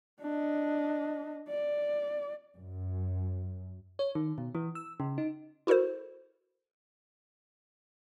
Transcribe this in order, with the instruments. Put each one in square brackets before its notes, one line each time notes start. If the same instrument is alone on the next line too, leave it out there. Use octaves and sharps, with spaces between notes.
[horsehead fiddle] D4 D#5
D5
[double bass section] F#2
[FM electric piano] C#5
D#3
B2
E3
E6
C#3
D#4
[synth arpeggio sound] E4 F#4 A4 A#4 C5